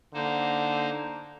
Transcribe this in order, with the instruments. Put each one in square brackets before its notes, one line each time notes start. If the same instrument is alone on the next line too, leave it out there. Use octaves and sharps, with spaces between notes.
[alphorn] D3 [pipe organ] A#3 D#4 C5